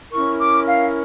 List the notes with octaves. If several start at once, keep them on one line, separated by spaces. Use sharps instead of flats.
C#4 E4 A#4 C#6
D6
F5